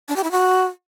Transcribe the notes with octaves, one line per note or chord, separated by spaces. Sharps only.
D4
G4
E4
F#4